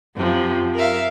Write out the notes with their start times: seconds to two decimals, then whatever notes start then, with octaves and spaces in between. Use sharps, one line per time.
0.15 F#2 C3 F3
0.75 A#4 E5 F5